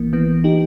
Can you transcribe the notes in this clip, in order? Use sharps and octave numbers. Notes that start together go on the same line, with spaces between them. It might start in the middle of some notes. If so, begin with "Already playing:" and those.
Already playing: A#1 E3 A#3
E3 B3
D#4 G4